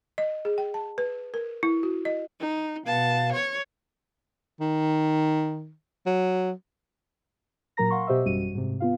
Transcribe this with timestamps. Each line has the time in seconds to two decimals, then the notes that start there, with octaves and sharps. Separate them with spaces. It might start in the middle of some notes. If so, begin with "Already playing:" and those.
0.18 D#5
0.45 G#4
0.58 G5
0.74 A5
0.98 B4
1.34 A#4
1.63 E4
1.83 F#4
2.05 D#5
2.40 D#4
2.86 B2 B3 F5 A5
3.33 C#5
4.60 D#3
6.06 F#3
7.77 A#2 F#3 A#4 A#5 A#6
7.90 F5 F#5 C6 C#6
8.07 B2 G4 C5 D#5 E5 E6
8.25 A1 F#2 G3 F#4 D#7
8.54 G#2 C3
8.80 B3 F4 F5